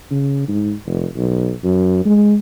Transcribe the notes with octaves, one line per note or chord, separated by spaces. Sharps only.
C#3
G#2
F1
B1
F#2
G#3